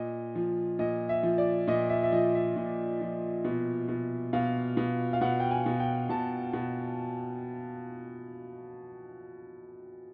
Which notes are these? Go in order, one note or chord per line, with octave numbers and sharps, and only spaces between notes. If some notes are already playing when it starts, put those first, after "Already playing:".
Already playing: A#2 D#5
F3
A#2 D#5
E5
F3
D5
A#2 D#5
E5
E5
F3 D#5
E5
A#2
F3
B2
B2
B2 F5
B2
F5
B2 F#5
G5
G#5
B2
G5
B2 A5
B2